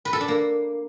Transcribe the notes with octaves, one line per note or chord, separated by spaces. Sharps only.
B4
A4
D4
A#3